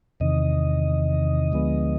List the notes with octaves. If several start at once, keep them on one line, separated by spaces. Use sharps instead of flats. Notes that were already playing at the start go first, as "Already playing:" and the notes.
E2 C3 D#3 D#5
D2 D3 F3 G#3 B3